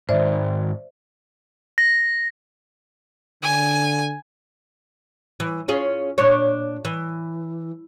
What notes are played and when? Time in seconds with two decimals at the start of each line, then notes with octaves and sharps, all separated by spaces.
0.09 G#2 D#3 C5 D5 E5
1.78 A#6
3.43 D3 G#5
5.40 E3
5.68 C#4 F4 G#4
6.18 A#2 D4 C#5
6.85 E3